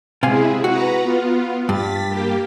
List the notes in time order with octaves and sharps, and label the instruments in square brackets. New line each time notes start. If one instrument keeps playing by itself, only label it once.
[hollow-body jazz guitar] C3 F5 G#5 [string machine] G#3 E4 G#4
[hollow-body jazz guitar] F#4 [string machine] B4 F#5 A#5
[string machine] B3 F4
[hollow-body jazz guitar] G2 [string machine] A6 B6
[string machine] A#3 G4